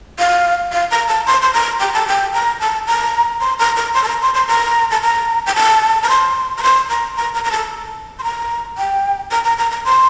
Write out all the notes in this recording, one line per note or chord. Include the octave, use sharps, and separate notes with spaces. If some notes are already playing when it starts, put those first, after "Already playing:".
F5
F5
A#5
A5
C6
C6
A#5
G5
A5
G5
A#5
A5
A#5
C6
A#5
A#5
C6
A5
A#5
C6
C6
A#5
A5
A#5
G5
A5
A#5
C6
A#5
C6
A#5
A#5
A#5
A#5
A5
C6
A#5
G5
A#5
A#5
A#5
A#5
C6